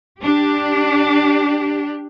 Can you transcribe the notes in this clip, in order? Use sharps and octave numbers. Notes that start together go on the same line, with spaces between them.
D4 G4